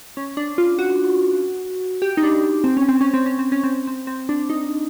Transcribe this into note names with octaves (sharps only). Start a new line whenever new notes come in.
C#4
D4
F4
F#4
G4
D#4
D4
C4
C#4
C4
C#4
C4
C#4
C4
C#4
C4
C4
C4
D4
D#4